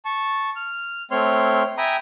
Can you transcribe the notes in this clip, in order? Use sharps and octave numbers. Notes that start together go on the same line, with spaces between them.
A5 C#6
F6
A3 C4 C#5 C6 F6
E5 G5 G#5 A#5 B5 D#6